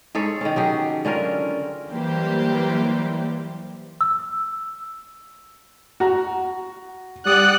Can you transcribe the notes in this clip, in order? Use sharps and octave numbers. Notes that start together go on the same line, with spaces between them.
G#2 G#4 A4 C#5
D#3 C#4
F#3 G4 G#4
D3 C#4 F4 A#4
E3 F#3 G3 A#3 G4 C5
E6
F#4 A#5
G3 D5 F#5 D#6 F#6